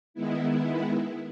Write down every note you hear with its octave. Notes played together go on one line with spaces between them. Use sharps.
D#3 G#3 B3 E4